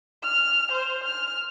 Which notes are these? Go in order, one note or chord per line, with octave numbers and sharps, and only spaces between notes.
F6
C5
F6